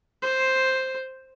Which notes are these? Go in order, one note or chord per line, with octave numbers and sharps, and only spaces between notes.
C5